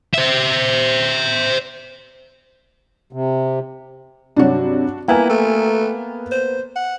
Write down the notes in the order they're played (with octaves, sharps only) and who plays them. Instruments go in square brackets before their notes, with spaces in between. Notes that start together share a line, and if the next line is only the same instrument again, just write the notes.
[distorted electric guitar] C5 E5
[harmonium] C3
[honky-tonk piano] G2 C3 F#3 [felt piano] D4 F#4
[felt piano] A#3 B3 [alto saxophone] E4 [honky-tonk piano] G5 G#5 A#5
[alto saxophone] A3
C5
F#5